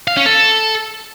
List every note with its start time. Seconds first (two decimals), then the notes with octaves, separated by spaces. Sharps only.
0.08 F5
0.17 C#4
0.26 A4